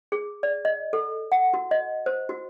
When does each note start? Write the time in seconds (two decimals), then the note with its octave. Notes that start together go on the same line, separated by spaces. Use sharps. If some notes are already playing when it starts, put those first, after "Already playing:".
0.12 G#4
0.43 D5
0.65 D#5
0.93 A4
1.32 F#5
1.54 F#4
1.71 D#5
2.06 C5
2.29 F#4